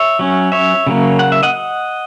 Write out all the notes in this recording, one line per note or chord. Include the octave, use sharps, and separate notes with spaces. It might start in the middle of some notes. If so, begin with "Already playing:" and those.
Already playing: C#5 E5
F#3 C#4
C#5 E5
C#3 F#3 A#3
F#5
E5
D#5 F#5